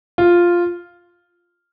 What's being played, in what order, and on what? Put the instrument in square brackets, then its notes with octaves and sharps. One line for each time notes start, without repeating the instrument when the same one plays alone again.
[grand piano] F4